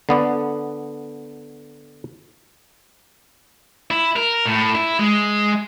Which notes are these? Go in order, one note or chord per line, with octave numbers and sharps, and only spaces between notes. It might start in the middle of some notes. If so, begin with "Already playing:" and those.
D3 B3 D5
E4
A#4
A2
E4
G#3